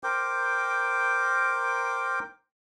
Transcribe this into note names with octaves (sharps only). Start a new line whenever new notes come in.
A#4 C5 G5 D6